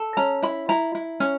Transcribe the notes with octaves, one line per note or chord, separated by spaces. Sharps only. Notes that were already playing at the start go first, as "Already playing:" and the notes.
Already playing: A4
C#4 A#5
E4 B5
E4 A#5
E4
C#4